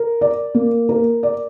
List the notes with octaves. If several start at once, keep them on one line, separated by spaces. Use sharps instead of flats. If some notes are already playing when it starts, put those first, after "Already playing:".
Already playing: A#4
D5
A#3
A#4
D5